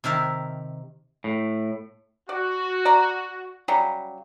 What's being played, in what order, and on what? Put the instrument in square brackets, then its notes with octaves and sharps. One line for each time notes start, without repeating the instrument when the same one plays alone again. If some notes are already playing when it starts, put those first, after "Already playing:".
[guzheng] C3 D#3 A#4 E5 A5
[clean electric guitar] A2
[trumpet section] F#4 [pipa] D5
[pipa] D5 A#5
C#3 F#3 G3